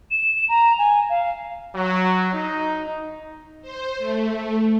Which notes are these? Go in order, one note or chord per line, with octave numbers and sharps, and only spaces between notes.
E7
A#5
G#5
F5
F#3
D#4
C5
A3